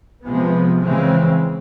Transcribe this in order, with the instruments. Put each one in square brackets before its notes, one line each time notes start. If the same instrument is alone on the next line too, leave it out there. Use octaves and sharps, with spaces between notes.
[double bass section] C3 F3 G#3 B3
C#3 E3 G#3 C4